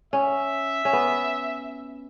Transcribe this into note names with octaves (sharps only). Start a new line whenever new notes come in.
C#4 E5
C#4
B3